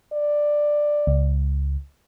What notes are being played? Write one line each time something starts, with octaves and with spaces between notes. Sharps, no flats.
D5
C#2